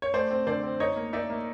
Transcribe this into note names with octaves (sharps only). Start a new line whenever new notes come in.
C#5
A3 C5 D5
C4
D3 C5 D5
C4
D#4 C#5 D#5
A#3
D#4 D5 E5
A#3